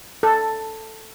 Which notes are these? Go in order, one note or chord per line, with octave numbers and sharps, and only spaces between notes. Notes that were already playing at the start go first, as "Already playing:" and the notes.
A4